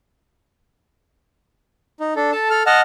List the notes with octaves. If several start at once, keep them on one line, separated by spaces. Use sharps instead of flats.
D#4
D4 A4
A4 A5
A4 F6
D#5 F#5 A5 F6